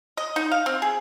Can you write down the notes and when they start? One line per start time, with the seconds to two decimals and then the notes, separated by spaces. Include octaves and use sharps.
0.17 D#5
0.36 D#4
0.51 F5
0.66 C4
0.82 G#4